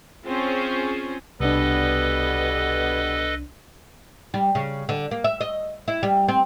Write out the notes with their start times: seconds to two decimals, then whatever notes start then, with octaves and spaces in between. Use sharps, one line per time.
0.24 C4 C#4 F4 G#4 C5
1.40 C2 B2 G3 B3 D4 A4 B4 D#5
4.34 G3
4.55 C#3
4.89 D3
5.11 A#3
5.24 E5
5.41 D#5
5.88 E4
6.03 G3
6.28 C4